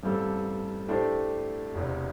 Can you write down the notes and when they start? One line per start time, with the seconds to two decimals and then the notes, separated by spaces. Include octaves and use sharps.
0.03 A1 G2 G3 C4 A4
0.88 A2 A3 D4 G4 C5
1.74 E1 E2 C3